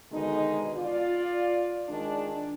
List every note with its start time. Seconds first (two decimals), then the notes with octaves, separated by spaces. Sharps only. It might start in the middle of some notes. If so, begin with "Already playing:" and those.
0.12 B2 D3 D#3 G#3 D#4
0.75 F4 D5
1.89 D#3 G#3 D4